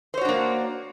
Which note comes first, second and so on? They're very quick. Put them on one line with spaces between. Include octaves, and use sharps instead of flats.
C5 C#5 F#4 D4 A#3